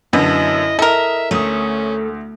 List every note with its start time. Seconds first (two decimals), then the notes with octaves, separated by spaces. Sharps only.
0.13 F#2 B2 D3 E4 D#5
0.79 A4 A#4 D#5 E5
1.31 D2 A3 C#4 D#6